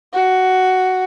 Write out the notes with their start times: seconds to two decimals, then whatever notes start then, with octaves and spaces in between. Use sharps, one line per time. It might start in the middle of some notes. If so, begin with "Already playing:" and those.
0.13 F#4